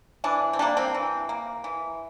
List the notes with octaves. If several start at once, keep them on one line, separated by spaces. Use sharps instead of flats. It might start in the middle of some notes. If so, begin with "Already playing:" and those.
E3 D4
C4
G3 A#3 D4
C4
E3
A#3
E3